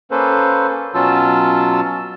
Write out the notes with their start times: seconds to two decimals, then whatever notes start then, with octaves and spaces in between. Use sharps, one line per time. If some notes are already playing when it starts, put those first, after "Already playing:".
0.11 A#3 C#4 A4 B4 C5
0.94 B2 F#3 C#4 F4 A5 E6